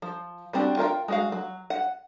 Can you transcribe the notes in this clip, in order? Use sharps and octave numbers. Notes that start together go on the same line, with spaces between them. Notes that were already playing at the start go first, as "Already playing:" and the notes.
F3
G3 B3 C4 D4 F#4
F4 A#4 F5 G5
G#3 F#4 F5
F#3
F#5